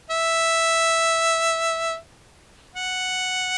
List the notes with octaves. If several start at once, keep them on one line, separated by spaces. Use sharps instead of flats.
E5
F#5